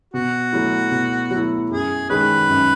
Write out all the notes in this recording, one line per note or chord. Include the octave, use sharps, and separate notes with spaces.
B2 F#4
F#3 A3 E4
B2
F#3 A3 E4
F#2 G#4
D#3 G#3 C#4 B4
F#2